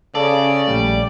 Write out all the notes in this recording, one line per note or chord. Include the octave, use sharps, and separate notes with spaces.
C#3 A4 D5
A#1 G3 A3